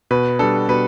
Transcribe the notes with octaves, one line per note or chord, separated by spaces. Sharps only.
B2 B4
G3 D4 A4
B2 B4